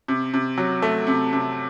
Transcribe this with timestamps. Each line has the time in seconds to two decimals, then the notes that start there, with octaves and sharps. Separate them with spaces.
0.08 C3
0.34 C3
0.57 F#3
0.82 A3
1.07 C3
1.33 C3